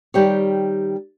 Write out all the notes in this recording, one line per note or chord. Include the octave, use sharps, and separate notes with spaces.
D#3 G3 G4 C#5